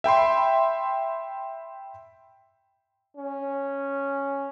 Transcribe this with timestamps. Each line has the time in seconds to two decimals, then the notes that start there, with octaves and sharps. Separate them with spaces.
0.04 E5 G5 B5 C6
3.17 C#4